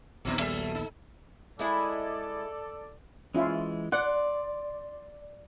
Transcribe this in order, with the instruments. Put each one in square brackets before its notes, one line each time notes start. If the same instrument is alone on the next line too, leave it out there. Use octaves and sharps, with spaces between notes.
[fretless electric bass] A#1 D#2 B3 [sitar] B2 C4 D#4
[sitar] F#3 A3 E5
D#4
[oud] G#3 E4 G#4 [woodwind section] A4 D5
[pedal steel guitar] E3 G#3 [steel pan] C#4 E4 F4
[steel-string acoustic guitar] D5 [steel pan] F#5 [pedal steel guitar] C6